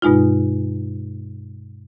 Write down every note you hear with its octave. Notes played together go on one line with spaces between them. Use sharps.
G2 B2 G#3 D#4 F4